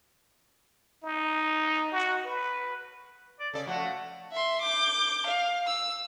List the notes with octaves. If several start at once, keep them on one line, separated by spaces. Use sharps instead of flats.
D#4
F#4
B4
D5
C#3 A4 D5
F3 A3 F#4 F#5
E5 C6
D6 G6
F5
E6